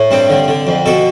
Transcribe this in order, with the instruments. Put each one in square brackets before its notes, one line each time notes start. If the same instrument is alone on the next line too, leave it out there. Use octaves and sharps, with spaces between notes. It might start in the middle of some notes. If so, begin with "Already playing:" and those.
Already playing: [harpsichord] A2
G2 C4
D3
D3
F2
B2 A4